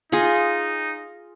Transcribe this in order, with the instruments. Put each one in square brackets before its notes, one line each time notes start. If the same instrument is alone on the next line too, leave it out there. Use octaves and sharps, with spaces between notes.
[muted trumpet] D#4 [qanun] F4 G#4